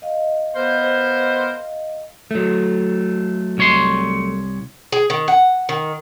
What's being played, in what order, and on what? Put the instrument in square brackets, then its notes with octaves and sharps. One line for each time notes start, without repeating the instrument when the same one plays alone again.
[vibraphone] D#5 F5
[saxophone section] B3 A#4 C5
[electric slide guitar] F#3 A3
[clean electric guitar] C2 C#5 C6
[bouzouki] G#4
D#3
F#5
D#3